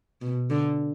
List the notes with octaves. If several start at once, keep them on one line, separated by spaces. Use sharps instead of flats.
B2
D3